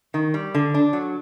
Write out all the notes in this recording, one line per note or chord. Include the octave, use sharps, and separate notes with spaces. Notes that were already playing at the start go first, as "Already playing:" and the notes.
D#3
G3
D3
D4
F#3